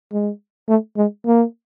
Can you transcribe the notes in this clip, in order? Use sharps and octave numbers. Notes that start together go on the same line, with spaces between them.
G#3
A3
G#3
A#3